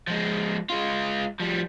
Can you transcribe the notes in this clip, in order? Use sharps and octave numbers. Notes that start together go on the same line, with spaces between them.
F3 G#3
G#3 F4
F3 G3